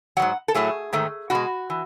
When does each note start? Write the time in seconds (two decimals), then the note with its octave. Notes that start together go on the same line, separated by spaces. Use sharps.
0.17 D#3 F#3 F#5
0.22 G#2
0.48 A4
0.54 A2 F#3 A3 G#4
0.93 G#2 D#3 A3
1.30 B2 G#3 F#4
1.70 E3